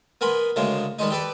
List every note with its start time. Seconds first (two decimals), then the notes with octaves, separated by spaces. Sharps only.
0.21 B3 A#4 G#5 B5 C6
0.56 D2 A2 C#3 G#3 A#4
0.99 D#3 G3 G#3 D#4
1.10 G4 A4 B4 D5